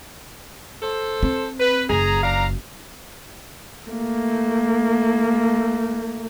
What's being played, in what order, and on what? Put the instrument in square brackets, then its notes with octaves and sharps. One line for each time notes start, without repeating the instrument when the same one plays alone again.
[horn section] A4 C5
[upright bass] C4
[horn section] B4
[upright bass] F#1 [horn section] G#4 A#5
[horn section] D4 F5 A#5
[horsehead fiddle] A3 A#3